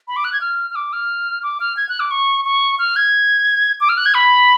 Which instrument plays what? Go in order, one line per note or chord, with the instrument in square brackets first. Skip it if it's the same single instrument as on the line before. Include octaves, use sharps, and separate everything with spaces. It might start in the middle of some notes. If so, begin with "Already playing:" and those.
[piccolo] B5
D6
F#6
G#6
F6
F6
D6
F6
D6
F6
G#6
F#6
D6
C#6
C#6
F6
G#6
D6
F6
F#6
G#6
B5